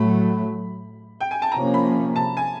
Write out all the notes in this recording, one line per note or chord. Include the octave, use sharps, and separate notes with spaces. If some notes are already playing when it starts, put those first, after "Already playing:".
Already playing: A2 F#3 A3 B5
G5
G#5
A5
C3 F3 A#3 C#4 A#5
B5
A5
G#5